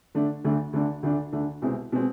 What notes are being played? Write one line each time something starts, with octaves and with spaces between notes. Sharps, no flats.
D3 A3 D4
D2 D3 A3 D4
D2 D3 A3 D4
D2 D3 A3 D4
D2 D3 A3 D4
C2 B2 G#3 C4
B2 G#3 C4